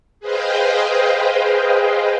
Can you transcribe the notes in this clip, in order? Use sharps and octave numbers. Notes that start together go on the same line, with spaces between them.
G#4 B4 C5 D#5 F5 G5